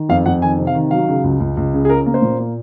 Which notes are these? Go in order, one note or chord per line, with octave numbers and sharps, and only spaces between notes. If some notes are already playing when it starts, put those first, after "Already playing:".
Already playing: D#3
F2 F5
F2 F#5
D#3 G#5
C3
F5
D#3
F#3 F5
C#3
C#2
C#2
C#2
C#3
G#4
C#4 A#4
A#3
C5
A#2
A#3